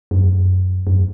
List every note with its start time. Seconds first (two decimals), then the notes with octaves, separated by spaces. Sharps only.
0.11 F#2
0.87 F#2